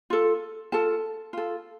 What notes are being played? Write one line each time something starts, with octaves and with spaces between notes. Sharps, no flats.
F4 A4
F4 A4 A5
F4 A4